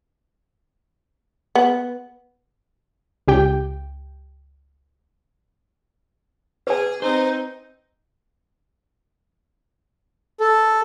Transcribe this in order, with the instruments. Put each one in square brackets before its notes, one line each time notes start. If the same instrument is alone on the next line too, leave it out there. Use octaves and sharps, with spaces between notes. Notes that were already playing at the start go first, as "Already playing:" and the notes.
[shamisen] B3
[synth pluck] C#2 G4 G5
[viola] G#4 [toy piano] B4 G#5
[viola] C4 D#4 [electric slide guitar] C5
[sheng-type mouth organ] A4